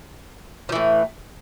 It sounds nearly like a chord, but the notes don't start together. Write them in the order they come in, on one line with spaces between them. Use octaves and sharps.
F3 E3 A2